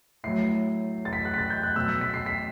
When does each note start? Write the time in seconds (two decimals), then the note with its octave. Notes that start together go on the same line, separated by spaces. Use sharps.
0.24 A2 F#3 C7
1.05 A6
1.13 B6
1.25 F#6
1.34 B6
1.38 A6
1.50 G6
1.63 F#6
1.76 B2 F#3 E6
1.89 B6
2.01 B6
2.14 C7
2.26 B6